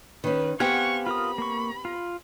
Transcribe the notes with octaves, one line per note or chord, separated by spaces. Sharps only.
D#3 C#4 B4
B3 C4 G4 F5 F#5 G#5 C#6
F4 A#4 B5 D#6
A#3 C#6
F4